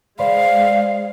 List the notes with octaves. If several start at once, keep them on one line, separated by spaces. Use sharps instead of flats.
G#3 B4 C5 D5 F5